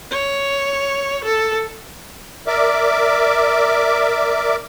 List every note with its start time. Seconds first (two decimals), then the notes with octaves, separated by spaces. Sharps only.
0.11 C#5
1.24 A4
2.47 A#4 D5 E5 D6